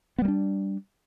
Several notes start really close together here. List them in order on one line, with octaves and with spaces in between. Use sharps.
B3 G3 A#3 D4